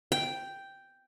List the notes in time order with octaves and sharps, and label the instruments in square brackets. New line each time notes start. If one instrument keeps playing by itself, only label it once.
[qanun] G5